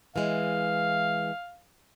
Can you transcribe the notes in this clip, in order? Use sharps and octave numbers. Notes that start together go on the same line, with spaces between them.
E3 G#3 F5